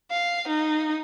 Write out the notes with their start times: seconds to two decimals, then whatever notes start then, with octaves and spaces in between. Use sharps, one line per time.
0.11 F5
0.48 D#4